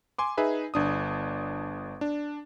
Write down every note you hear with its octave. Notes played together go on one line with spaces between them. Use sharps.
G#5 C6 D6
D#4 G#4 B4 E5
G1 D4 D#6
D4